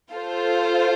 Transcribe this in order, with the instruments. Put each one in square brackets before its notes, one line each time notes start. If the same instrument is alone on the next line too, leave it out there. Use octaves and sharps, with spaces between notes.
[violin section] F4 A4 C5